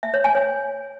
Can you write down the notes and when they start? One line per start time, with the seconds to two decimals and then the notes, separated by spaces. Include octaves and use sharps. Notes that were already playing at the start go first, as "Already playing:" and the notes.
0.03 E5
0.14 C#5
0.24 G#5
0.35 C#5